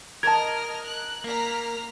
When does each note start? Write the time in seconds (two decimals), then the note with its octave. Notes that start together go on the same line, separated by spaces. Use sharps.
0.23 A#4 D#5 A5 F6 G#6
0.84 F#6
1.24 A#3 A#5 F6 B6